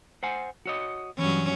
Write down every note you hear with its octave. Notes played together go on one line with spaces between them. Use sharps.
C5 F#5 G#5
F#4 C#5 D#5
G2 E3 F#3 C#4